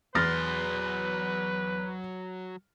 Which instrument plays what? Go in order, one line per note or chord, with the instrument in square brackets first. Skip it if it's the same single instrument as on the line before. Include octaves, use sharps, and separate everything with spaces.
[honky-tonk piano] E2 [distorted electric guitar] F#3 C6 [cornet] B4 [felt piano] F6 A6 A#6